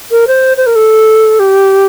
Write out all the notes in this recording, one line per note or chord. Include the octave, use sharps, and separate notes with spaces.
A#4
C5
C5
A#4
A4
G4